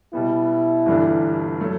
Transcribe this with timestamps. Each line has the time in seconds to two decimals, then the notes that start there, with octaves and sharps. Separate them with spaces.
0.13 B2 G3 B3 E4
0.86 G1 G2 E3 A3 D4
1.61 F#3 A3